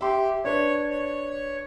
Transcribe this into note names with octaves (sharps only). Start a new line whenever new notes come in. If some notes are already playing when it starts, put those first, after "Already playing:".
G4 E5 C6
D4 B4 C#5
C#5